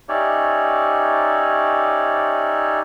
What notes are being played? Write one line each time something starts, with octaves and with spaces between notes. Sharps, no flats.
C#4 D#4 G4 C#5 D5 E5